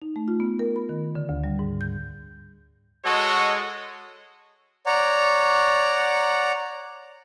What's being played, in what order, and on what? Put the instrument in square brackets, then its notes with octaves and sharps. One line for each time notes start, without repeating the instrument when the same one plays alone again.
[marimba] D#4
A3
F4
B3
A#4
B5
D#3
D3
D2
G3
G#2
G6
[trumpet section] G#3 F#4 A4 C#5 D#5
[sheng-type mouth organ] C#5 D5 F#5 A#5